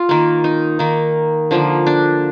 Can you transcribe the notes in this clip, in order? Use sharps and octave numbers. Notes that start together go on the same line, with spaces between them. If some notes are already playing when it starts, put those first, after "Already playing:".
Already playing: F4
D#3 A#3
D#4
D#3 A#3
D3 F3 A#3
D4